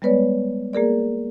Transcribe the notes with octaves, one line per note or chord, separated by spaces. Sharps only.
G3 G#3 B3 B4 C#5 D5
A#3 G#4 A#4 D5